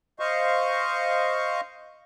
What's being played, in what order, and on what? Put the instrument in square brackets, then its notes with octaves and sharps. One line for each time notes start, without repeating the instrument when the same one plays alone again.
[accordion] C5 D#5 F5 C#6